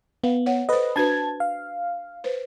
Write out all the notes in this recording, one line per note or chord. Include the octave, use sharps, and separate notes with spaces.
B3 F5
C#5 F#5
A4 B4 C5 D#5
D4 F#4 B4 A5 G#6
F5
B4 C5